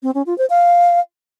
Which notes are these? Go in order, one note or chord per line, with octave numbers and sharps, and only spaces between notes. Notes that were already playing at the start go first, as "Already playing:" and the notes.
C4
C#4
F4
C5
F5